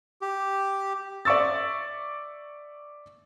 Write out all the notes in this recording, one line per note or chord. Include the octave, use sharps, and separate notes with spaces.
G4
D5 E5 C#6 E6 A6